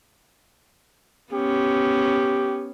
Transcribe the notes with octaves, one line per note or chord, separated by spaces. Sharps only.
B3 C#4 G4